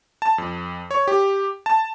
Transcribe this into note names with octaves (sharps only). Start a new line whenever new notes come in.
A5
F2
C#5
G4
A5